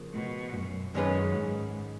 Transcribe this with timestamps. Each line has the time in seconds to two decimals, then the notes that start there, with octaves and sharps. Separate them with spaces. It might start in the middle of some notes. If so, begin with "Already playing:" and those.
Already playing: C#3 F3 A#3
0.14 B2
0.55 F#2
0.94 F#2 D#3 G#3 C#4 G#4 B4
1.34 G#2